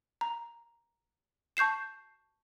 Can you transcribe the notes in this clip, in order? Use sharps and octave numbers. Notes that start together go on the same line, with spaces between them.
A#5
A5 C#6 G6 C7 E7